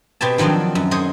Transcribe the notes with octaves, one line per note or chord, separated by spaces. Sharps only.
B2 C4 G4 G#5 A5
D#3 F3 F#3 C4 D4
F#2
G#4 C5 C#5 D#5